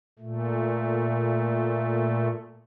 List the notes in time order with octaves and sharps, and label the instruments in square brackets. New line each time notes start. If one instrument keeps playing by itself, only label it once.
[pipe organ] A#2 A3